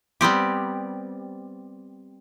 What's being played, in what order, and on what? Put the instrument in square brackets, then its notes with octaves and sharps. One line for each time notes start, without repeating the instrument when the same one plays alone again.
[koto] G3 B3 C4 G4